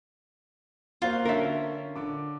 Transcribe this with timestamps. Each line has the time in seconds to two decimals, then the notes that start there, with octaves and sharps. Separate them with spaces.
1.02 A#3 F4 F#4 C5
1.25 D3 C#4 A#4 E5
1.96 D3 D6